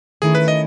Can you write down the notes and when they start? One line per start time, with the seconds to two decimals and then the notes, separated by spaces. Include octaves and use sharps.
0.22 D#3 A3 C#4 E4 G#4
0.35 B4
0.48 D#5